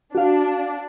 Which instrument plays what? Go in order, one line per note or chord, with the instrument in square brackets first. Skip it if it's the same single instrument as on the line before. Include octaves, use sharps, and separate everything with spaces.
[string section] D4 [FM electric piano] F#4 F5